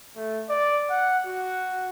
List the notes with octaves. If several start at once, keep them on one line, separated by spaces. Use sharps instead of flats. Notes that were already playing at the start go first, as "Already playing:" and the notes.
A3
D5
F#5
F#4